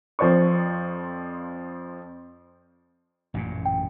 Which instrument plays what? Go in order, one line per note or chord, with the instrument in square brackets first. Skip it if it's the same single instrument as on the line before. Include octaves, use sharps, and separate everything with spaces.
[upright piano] F2 F3 C5 D5 C#6
[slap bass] A1 F#2 A#2
[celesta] G5